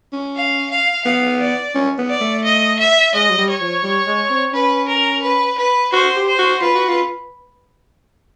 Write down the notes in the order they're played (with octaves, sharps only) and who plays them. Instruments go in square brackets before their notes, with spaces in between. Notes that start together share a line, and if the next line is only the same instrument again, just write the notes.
[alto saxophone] C#4
[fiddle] F5
F5
[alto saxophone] B3 [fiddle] F5
[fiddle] D5
[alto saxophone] C#4
B3
[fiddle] D5
[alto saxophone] A3
[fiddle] D#5
E5
[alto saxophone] G#3 [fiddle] D#5
[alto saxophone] F#3
G3
[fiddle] C#5
[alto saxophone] F3
G3
G#3
C4
[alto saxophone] C#4 [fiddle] B4
[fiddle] A#4
B4
B4
[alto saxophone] F#4 [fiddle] C5
[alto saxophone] G4
[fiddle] C5
[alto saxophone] F#4
[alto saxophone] F4 [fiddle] B4
[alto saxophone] F#4
F4